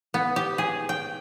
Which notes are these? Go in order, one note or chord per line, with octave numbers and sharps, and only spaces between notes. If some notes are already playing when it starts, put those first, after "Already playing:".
B3
G4
G#4
G5